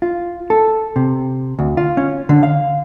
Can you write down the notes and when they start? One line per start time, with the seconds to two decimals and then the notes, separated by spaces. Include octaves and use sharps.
0.02 F4
0.50 A4
0.96 C3
1.59 D2
1.77 F4
1.97 C#4
2.29 D3
2.43 F5